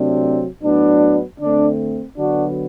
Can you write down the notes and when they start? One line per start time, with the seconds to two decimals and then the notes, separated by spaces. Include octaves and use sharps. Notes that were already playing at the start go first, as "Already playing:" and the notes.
Already playing: C3 F#3 A3 C4 D4
0.62 A2 F#3 B3 D4
1.40 D3 A3 C4 D4
2.18 D3 F#3 B3 D4 F#4